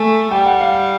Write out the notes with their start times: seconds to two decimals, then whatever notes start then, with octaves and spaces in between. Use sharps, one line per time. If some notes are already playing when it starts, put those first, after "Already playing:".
Already playing: A3 G#5
0.31 G3 G5
0.46 F#5
0.61 F5